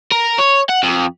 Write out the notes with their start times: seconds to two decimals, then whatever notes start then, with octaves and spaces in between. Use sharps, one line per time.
0.11 A#4
0.38 C#5
0.69 F#5
0.83 F2